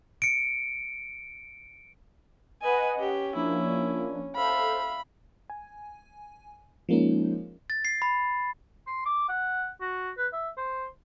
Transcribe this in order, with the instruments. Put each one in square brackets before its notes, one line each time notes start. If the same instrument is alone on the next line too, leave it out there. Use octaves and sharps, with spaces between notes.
[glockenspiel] C#7 D7
[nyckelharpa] B4 G#5 [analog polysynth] D#5 F#5
[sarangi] C#4 [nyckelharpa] G4
[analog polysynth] F3 A#3 D4 [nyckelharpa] E4
[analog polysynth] A4 C5 [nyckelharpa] E5 F5 [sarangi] B5
[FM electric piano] G#5
F3 G#3 A#3 C#4 D#4
[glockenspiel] A6
C7
B5
[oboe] C6
D6
F#5
F#4
B4
E5
C5